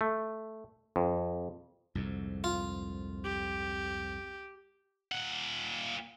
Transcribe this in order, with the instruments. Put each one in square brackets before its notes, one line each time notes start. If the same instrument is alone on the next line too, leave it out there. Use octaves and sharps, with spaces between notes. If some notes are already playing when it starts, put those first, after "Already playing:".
[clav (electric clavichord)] A3
F2
[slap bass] C2 F2 G#2
[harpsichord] F4
[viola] G4
[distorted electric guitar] A#2 F#5